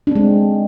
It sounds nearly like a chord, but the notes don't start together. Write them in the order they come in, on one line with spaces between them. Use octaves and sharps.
D4 C4 G#3